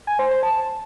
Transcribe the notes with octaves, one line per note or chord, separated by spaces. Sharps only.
G#5
C5
C5
A5